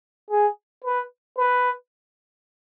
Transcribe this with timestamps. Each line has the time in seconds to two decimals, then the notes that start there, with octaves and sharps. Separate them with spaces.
0.31 G#4
0.84 B4
1.38 B4